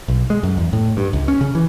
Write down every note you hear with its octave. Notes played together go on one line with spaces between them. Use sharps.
B1
G#3
F#2
E2
A2
G2
C#2
C#4
C#3
E3